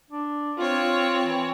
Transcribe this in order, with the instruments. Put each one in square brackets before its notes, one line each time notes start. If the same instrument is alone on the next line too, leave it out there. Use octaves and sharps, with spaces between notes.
[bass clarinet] D4
[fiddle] C4 C#5 [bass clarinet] F4
[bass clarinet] E3